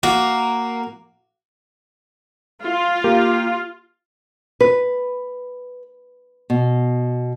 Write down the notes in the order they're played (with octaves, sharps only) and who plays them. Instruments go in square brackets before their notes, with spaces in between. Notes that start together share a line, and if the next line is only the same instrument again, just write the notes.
[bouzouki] A#3 [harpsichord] F#4
[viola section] F4
[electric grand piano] A#3 G4 A#4
[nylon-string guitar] B4
B2